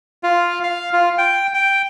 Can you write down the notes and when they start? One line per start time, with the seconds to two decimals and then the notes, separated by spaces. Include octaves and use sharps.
0.23 F4
0.63 F5
0.93 F4
1.18 G5
1.54 G5